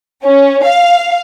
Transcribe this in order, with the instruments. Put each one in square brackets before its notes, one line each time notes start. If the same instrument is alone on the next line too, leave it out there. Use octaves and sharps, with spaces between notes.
[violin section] C#4
F5